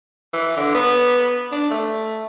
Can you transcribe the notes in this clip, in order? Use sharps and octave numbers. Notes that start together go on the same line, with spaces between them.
E3
D3
B3
D4
A3